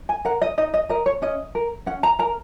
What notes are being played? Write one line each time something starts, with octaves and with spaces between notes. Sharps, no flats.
G#5
A#4 F#5
D#5
D#4 D#5
D#5
A#4 D#5
C#5
C#4 D#5
A#4
C#4 F#5
A#5
A#4 A#5